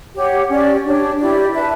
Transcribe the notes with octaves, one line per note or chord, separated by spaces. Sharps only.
G4 C#5 F#5
C#4 G4 D5
D4 G4 C#5
E4 G4 D5
B4 E5 A5